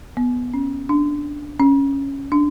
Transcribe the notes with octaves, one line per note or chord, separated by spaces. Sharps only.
B3
C#4
D4
C#4
D4